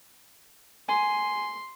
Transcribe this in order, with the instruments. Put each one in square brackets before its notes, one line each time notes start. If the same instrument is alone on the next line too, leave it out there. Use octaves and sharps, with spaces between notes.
[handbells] G#5 [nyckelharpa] C6